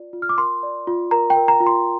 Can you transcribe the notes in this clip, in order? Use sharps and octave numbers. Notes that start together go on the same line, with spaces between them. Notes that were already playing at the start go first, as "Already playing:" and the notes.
Already playing: F4 D5
F4
F6
D6
A#4 C6
D5
F4
A#4 A#5
G5
A#4
A#5
F4
C6